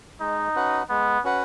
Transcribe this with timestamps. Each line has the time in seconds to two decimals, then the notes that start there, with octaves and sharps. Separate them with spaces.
0.21 G#3 D#4
0.55 C#4 F#4 B4 F#5
0.89 G#3 B3
1.24 C#4 F#4 B4 F#5